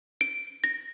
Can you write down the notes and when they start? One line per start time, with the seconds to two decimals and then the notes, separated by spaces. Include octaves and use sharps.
0.21 D7
0.64 A#6